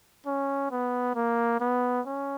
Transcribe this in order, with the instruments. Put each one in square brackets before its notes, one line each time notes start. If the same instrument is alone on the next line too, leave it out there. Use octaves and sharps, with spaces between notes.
[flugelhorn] C#4
B3
A#3
B3
C#4